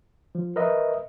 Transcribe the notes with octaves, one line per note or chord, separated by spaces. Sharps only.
F3
A#4 B4 D#5 E5